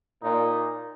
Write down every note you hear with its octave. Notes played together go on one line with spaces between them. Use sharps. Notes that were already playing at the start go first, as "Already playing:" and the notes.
A#2 D#4